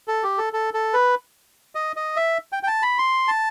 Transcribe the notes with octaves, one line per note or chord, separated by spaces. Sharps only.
A4
G4
A4
A4
A4
B4
D#5
D#5
E5
G5
G5
A5
B5
C6
A5